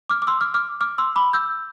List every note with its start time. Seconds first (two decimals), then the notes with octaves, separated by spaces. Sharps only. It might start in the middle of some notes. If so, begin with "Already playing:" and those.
0.09 D6 F6
0.22 D6
0.27 C6 E6
0.41 D6 F6
0.54 D6 F6
0.81 D6 F6
0.98 C6 E6
1.16 B5 D6
1.33 E6 G6